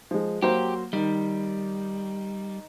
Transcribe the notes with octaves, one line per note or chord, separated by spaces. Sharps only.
F3 G#3
F#3 A#3 G4 C5
D#3 G3